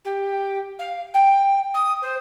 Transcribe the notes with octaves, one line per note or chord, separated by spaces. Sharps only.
G4
F5
G5
D#6
C5